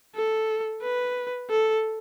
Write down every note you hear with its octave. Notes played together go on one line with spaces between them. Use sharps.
A4
B4
A4